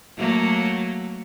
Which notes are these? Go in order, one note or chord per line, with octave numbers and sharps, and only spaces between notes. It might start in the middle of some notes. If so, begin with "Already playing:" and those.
F#3 A3 A#3